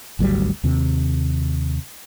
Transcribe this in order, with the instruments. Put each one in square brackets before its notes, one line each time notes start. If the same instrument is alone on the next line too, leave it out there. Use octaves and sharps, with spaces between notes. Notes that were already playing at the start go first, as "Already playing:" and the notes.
[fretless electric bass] G#1 D2 F#3 G3
D#2 C3